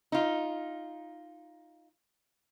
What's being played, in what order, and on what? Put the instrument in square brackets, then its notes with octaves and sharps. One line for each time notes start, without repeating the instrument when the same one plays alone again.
[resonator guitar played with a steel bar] D#4 F4